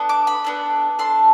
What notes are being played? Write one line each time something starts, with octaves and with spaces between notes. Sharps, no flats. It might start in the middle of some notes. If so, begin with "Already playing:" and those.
Already playing: B3 D4 A4
D6
B5
B3 D4 A4
D4 A4 C6